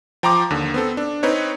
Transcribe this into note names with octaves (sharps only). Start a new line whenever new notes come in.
F3 G5 A#5 C6 D6
D#2 D3
B3 C4 A4
D4
C4 D#4 B4 C#5